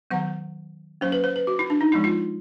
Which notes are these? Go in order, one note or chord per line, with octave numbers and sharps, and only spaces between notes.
D#3 F#3 B3 F#5
F#3 A#3 C#4 C5
B4
C5
B4
F#4
E4
D4
D#4
F3 G#3 B3 E4
F4